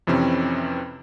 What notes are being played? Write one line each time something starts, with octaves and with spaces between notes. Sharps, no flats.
F2 C3 E3 C4 C#4